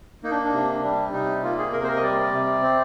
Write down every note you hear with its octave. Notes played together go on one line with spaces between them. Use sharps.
A#3 D#4
D4
D4
C3
G3 D4
C3 D#4
A#3 F4
G#4
C3 A#4
C5
A#4
D#5
G3 D5
C3
C4